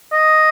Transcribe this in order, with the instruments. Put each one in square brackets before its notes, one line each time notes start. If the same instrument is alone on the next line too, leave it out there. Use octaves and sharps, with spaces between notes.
[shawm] D#5